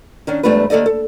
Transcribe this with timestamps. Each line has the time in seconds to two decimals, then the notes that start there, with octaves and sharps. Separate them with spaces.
0.27 D#3 C#4 D4
0.43 E2 G#2 G3 A3 D4 B4
0.70 D#2 D#3 A4 D5 D#5
0.86 A4